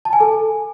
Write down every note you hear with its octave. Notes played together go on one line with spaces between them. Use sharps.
A5
G#5
A4